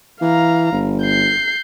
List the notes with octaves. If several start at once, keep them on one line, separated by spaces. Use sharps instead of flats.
E3 F5 A#5
G1
G6 C7